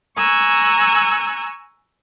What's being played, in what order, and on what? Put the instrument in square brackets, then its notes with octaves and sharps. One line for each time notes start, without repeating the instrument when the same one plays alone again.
[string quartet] G#5 A#5 C#6 E6 F#6 G#6